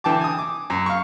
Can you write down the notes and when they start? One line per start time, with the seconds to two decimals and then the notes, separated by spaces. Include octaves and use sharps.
0.04 D3 E3 G5 A5 D6
0.21 G#5 D#6
0.39 D6
0.70 F#2
0.86 F5 C#6